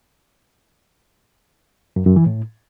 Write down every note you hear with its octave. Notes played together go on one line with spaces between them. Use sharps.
F#2
F#2
E3
A2